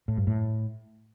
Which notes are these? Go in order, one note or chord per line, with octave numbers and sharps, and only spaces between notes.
A2
G2
A2